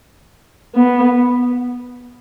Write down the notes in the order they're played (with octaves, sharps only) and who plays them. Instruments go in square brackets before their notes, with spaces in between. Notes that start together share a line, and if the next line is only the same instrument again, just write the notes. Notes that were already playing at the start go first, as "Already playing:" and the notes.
[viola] B3